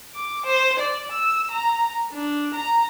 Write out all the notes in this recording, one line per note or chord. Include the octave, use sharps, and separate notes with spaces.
D6
C5
D5
E6
A#5
D4
A#5